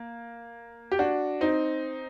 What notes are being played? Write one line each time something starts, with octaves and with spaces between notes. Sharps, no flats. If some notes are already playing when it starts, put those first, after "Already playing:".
Already playing: A#3
G4
D4 F#4
C4 D#4